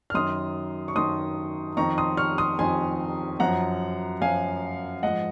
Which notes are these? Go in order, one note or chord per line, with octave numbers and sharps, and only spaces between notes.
F6
F#2 D#3 C6 D#6
C#6
F#2 D#3 C6 D#6
F2 D#3 A#5 C#6
C6 D#6
C#6 F6
C6 D#6
F2 D#3 G#5 C6
F#2 F3 F#5 A#5
F#2 F3 F5 G#5
G#2 F3 D#5 F#5